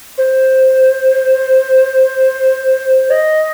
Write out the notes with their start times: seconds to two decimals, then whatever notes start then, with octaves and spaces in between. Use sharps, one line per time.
0.18 C5
3.10 D#5